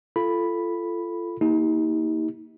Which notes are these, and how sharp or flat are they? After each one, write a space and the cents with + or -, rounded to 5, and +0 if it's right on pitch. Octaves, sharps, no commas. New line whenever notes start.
F4 -25 A4 +0 B5 +0
A#3 +0 D#4 +40 G4 +0